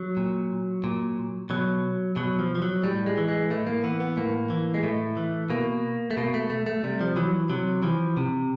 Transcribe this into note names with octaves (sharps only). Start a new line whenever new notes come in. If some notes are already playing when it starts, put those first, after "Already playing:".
Already playing: F#3
A#2
A#2
B2 F#3
B2 F#3
F3
F3
F#3
A2 G3
G#3
E3
G#3
A2 A3
A#3
E3 B3
B3
A2 A#3
E3
G#3
A2 A3
E3
B2 A#3
A3
B2 A#3
A3
A3
A3
C3 G3
F3
E3 F#3
C3 F#3
E3 F3
C3